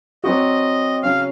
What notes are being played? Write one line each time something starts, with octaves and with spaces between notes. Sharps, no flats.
F#3 C4 F#4 D#5
C#3 F#3 C#4 F5